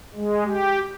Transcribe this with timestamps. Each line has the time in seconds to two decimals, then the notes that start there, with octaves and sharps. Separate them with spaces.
0.14 G#3
0.46 G4